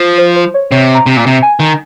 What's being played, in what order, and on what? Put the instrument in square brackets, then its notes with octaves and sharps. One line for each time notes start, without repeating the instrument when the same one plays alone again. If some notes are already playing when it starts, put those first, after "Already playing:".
Already playing: [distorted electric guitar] F3
[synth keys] C5
C5
C#5
[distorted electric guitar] C3 [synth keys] C#5
[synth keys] A#5
[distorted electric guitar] C3
[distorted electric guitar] A#2 [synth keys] A#5
[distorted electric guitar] C3
[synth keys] G#5
[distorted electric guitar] D#3